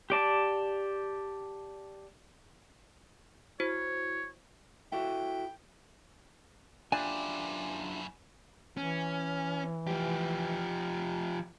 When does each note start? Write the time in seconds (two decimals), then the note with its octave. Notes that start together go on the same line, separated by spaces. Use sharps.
0.10 G4 D5 A5
3.60 E4 F#4 C5 C#5
4.92 E4 F#4 A4 G5
6.92 F#2 D4 E4 F4 G4 G#5
8.77 E3 C#4
9.87 F3 G4